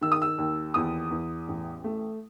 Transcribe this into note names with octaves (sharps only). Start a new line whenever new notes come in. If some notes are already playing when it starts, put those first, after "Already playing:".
D#3 E6
D#6
E6
D#2
E2 D#6
E2
A1
A3